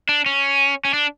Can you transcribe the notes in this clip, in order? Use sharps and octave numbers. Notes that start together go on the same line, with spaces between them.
D4
C#4
C#4
D4